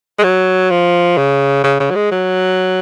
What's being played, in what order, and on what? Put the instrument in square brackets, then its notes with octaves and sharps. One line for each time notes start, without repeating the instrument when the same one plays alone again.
[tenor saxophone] G#3
F#3
F3
C#3
C#3
C#3
F#3
G#3
F#3